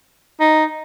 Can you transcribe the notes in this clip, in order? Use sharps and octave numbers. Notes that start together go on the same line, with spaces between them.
D#4